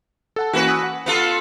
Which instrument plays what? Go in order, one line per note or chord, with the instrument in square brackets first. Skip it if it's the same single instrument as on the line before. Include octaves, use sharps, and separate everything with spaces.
[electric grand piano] A4 F#5 A5
[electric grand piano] E3 A#3 C#4 [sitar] F#4 B4
[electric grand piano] G#5 D#6 E6
F#5
[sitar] B3 F4 A4